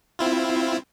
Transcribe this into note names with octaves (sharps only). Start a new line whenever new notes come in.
C4 E4 F4